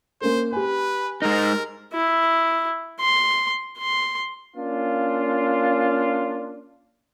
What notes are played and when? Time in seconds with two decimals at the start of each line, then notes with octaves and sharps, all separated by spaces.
0.21 A#3 C#4 A#4 C5
0.52 G4 B4 G#5
1.22 G#3 D#4 A#4
1.93 E4
3.00 C6
3.78 C6
4.57 A#3 C#4 D4 F4